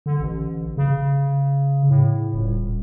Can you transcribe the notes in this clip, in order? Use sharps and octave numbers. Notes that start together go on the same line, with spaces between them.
D3
A1
C#3
A2
D#1